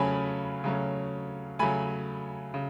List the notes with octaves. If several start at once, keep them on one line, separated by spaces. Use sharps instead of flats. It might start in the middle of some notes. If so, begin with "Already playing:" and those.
Already playing: C#3 F#3 A3 C#4 G#5 A5 B5
C#3 F#3 A3 C#4
C#3 F#3 A3 G#5 B5
C#3